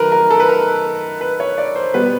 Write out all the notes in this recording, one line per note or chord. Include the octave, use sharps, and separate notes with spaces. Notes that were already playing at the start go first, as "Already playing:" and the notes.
Already playing: D#3 F#3 A3 A#4 B4
A#4
A4
B4
A#4
B4
C#5
D5
C5
B2 G3 B3 B4